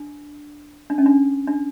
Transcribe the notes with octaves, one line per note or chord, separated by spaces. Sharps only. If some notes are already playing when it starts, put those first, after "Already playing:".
Already playing: D4
D4
C#4
D4
D4